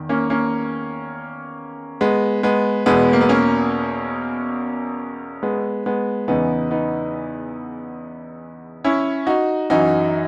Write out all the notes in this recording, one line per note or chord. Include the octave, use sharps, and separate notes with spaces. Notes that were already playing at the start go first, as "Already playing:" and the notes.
Already playing: E2 D#3
A#3 C#4
A#3 C#4
G#3 B3
G#3 B3
E2 B2 G#3 B3
A#3
B3
A#3 C#4
G#3 B3
G#3 B3
E2 C#3 E3 B3 D#4
B3 D#4
C#4 E4
D#4 F#4
F#2 E3 D#4 F#4